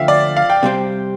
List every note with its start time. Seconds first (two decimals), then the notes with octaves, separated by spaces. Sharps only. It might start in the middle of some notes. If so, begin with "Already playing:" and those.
Already playing: D3 F3 A3 E5 F5 G5
0.08 D5
0.37 F5
0.50 G5
0.63 C3 G3 C4 G4